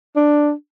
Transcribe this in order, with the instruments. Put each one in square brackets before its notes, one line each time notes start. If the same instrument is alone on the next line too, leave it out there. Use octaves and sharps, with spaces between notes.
[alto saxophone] D4